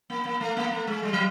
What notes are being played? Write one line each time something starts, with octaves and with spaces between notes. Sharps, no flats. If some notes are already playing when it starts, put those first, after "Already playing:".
A#3
A#3
A3
A#3
A3
G#3
G3
F#3